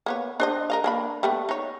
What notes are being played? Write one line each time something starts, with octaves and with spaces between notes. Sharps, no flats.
A#3 B3 C#5
D4 C5 D#5
A#4 D#5 F5
A#3 D4 B5
G3 A3 B3
D#4 C#5